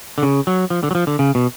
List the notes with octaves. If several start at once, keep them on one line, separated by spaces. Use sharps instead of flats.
D3
C#3
F#3
F3
D3
F#3
F3
D3
C#3
B2